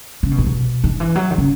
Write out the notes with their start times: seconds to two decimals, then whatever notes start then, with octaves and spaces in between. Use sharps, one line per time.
0.23 C#3
0.31 B2
0.38 A2
0.46 B2
0.84 D#3
1.00 E3
1.15 F#3
1.30 D#3
1.38 C#3